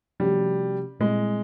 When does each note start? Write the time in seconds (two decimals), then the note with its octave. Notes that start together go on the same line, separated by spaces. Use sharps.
0.20 C3 F3 G3 A3 C#4 F#4
1.00 A#2 G3 G#3 C4 E4